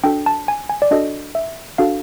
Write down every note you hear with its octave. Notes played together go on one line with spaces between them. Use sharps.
D4 F#4 A4 G5
A5
G#5
G#5
D5
D4 F#4 A4 D#5
E5
D4 F#4 A4 F5